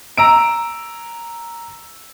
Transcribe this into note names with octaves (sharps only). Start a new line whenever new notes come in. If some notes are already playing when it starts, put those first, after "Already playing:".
A#5 E6 D7